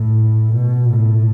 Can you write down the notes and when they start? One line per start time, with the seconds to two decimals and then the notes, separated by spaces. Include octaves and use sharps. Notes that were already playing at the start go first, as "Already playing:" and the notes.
Already playing: A2
0.53 B2
0.93 A2